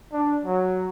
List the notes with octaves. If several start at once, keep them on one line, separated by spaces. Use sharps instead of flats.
D4
F#3